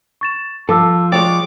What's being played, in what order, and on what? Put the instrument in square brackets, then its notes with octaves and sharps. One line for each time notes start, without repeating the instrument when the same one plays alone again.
[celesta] C#6 A6 E7
[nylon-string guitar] F3 [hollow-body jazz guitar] A4 [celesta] A5 D6 E6
[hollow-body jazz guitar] G#3 C#5 D5 [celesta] G5 [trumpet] D6